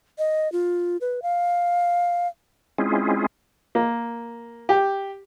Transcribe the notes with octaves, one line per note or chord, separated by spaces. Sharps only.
D#5
F4
B4
F5
G#3 C4 C#4 E4 F4 G#4
A#3
G4